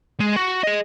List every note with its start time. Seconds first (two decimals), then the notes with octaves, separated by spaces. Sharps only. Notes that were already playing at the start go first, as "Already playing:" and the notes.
0.20 G#3
0.36 F#4
0.63 G#4 D#5